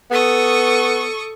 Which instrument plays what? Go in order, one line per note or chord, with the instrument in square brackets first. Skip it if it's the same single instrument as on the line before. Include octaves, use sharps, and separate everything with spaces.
[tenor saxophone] B3 [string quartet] A4 C#6 D#6